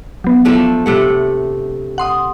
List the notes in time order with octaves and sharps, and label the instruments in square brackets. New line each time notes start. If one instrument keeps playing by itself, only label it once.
[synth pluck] F#3 B3
[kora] F3 A3 D4
C3 A3 F#5
[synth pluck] F#5 C6 D#6